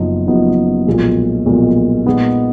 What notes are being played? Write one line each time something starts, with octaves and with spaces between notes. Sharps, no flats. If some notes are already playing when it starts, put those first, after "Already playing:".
Already playing: F#1 F#2 F3 B3 D#4
F#1 F#2 F3 B3 D#4
B1 A#2 F3 G#3
B1 A#2 F3 G#3
A#2 G#3 B3 D#4